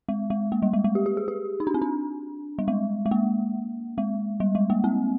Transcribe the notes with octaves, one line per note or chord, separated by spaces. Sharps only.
G#3
G#3
A#3
G3
G#3
G#3
G4
G4
G#4
G4
D#4
D4
C4
D4
G3
G#3
G#3
A#3
G#3
G3
G#3
A#3
C4